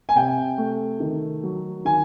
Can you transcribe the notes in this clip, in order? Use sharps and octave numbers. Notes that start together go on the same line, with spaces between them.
G#5
C3 G5
A3
D#3
F#3
D#3 G#5